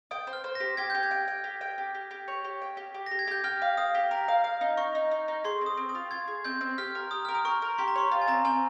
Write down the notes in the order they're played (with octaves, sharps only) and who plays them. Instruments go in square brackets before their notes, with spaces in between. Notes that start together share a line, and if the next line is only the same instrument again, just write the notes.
[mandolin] G5 [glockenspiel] D#6
[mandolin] C5
[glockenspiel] F6
[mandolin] C5
[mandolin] G4 [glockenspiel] A#6
[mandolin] G4 [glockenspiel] G#6
[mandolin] G4 [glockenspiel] G6
[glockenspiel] G#6
[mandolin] G5
G5
G4
G5
G4
G4
G4
C#5
G4
G5
G4
G4
[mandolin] G4 [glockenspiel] A#6
[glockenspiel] G#6
[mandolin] G4 [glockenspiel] G6
[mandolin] G4 [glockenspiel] F6
[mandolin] F5
[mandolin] F5 [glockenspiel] D#6
[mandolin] G4
A#4
F5
F5
D#4
[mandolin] D#4 [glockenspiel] C#6
[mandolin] D#4
D#4
D#4
[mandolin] G#4 [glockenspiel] C6
[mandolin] C4
[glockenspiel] D#6
[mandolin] C4
[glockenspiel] D#6
[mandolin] F4
[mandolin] F4 [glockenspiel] G#6
[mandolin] G#4
[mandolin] C4 [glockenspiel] G6
[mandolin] C4
[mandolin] G4 [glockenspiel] F6
[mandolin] A#4
[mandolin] G4 [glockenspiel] D#6
[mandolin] A#4 [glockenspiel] F6
[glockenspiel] D#6
[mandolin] A#4 [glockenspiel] C#6
[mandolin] A#4
[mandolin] G4 [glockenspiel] C6
[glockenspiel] A#5
[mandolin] C#5 [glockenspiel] C6
[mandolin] F4
[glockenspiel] G#5
[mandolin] C4 [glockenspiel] A#5
[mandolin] C4 [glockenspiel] G#5